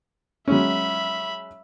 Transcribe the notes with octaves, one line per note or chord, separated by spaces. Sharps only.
F#3 G#3 C#4 E5 B5